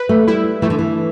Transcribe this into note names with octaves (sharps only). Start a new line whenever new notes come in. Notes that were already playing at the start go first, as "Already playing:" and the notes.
Already playing: B4
A3
G3 E4
E3 A3
D3
E3